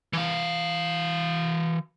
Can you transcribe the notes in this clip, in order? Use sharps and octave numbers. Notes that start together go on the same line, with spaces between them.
E3 F5